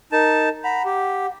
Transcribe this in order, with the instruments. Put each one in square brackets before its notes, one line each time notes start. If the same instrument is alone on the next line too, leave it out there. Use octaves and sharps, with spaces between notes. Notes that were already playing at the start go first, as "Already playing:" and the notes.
[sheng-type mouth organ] D#4 A5 [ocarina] A#4
[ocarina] F#5 [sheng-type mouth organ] A#5 B5
[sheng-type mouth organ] G4